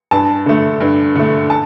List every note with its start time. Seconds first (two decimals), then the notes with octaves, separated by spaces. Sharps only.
0.11 G2 A5
0.46 D3 A3
0.80 G2
1.16 D3 A3
1.50 A5